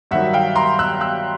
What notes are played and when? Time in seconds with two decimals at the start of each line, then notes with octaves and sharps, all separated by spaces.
0.11 G2 D#3 F#3 E5 F#5
0.33 F5 G5
0.56 A#5 C6
0.79 E6 F#6
1.01 E6 F#6